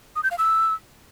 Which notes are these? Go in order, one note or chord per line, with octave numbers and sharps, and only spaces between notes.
D#6
G6
F5
E6